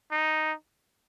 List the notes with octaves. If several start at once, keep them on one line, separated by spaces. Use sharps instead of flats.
D#4